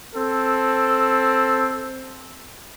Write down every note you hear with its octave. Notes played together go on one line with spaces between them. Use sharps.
C4 A4